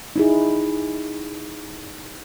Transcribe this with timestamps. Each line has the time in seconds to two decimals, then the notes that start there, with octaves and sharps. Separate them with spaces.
0.16 D#4 E4 G#4